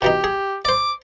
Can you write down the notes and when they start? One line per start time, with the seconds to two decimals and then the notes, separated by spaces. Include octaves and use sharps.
0.02 B2 E3 D#4 G4
0.24 G#4
0.65 C5 D5 D6